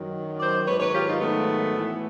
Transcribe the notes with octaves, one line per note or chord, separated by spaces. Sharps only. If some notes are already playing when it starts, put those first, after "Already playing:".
Already playing: F#2 D#3 F#3
C5 D5
G#2 D#3 F#3 B4 C#5
B4 C#5
F4 G4
D#4 F4
A3 B3
A2 E3